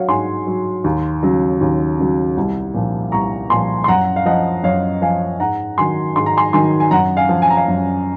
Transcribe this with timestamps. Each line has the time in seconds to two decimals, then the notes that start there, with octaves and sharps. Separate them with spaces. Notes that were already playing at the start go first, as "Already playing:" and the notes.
Already playing: F#3 C#5 F5 F#5
0.08 G#2 G#5 C6
0.47 F#3
0.84 D#2
1.23 C#3 F#3
1.61 D#2
1.98 C#3 F#3
2.37 C2
2.74 A#2 F3
3.12 C2 A#5 C#6
3.50 A#2 F3 G#5 C6
3.84 C6
3.88 F#2 F#5 A#5
4.16 F5
4.26 F3 D#5 F#5
4.63 F#2 C#5 F5
5.02 F3 F5 G#5
5.40 G#2 F#5 A#5
5.78 D#3 F#3 G#5 C6
6.16 G#2 C6
6.26 A#5
6.37 G#5 C6
6.53 D#3 F#3 G#5 C6
6.80 G#5
6.91 F#2 F#5 A#5
7.17 F5 G#5
7.29 F3
7.42 G#5
7.50 A#5
7.57 F5 G#5
7.68 F#2